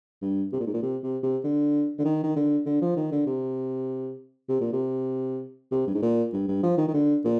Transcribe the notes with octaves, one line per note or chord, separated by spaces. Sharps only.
G2
C3
A#2
G#2
A#2
C3
C3
C3
D3
D3
D#3
D#3
D3
D3
F3
D#3
D3
C3
C3
A#2
C3
C3
G2
G#2
A#2
G2
G2
F3
D#3
D#3
D3
A#2